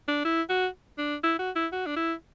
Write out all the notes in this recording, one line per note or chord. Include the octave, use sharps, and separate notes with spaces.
D4
E4
F#4
D4
E4
F#4
E4
F#4
D4
E4